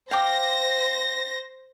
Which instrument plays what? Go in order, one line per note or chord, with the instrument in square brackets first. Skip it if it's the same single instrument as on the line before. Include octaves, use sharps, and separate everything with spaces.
[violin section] C5 A#6 [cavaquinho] F5 G5 D6